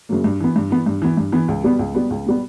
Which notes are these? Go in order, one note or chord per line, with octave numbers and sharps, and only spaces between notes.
F#2 C#3 F#3 A#3
G2
E3 B3
G2
E3 B3
G2
E3 B3
G2
E3 B3
C#2
B2 G3 B3
C#2
B2 G3 B3
C#2
B2 G3 B3